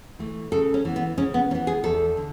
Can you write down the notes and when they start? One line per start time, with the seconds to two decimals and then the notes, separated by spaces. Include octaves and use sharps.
0.19 E3 A3
0.52 C#3 A4
0.74 C#4
0.85 E3 B3
0.96 B3
1.18 C#3 C#4
1.34 B3
1.50 E3 C#4
1.55 B3
1.67 G#4
1.84 E2 A4
2.17 D3